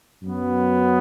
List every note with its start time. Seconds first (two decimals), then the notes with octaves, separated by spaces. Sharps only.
0.23 F#2 F#3 B3